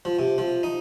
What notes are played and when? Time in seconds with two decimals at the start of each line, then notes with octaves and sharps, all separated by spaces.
0.05 F3
0.19 C3
0.38 F3
0.63 D#4